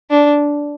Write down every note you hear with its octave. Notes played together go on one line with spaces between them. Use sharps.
D4